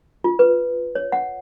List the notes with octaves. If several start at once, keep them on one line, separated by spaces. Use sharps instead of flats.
F4
B4
C#5
F#5